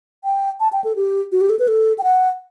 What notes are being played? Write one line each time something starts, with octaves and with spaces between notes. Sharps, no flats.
G5
A5
G5
A4
G4
F#4
G4
A4
B4
A4
G5
F#5